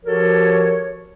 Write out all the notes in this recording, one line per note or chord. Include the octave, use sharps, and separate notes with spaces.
F3 F#4 G4 A4 A#4 C#5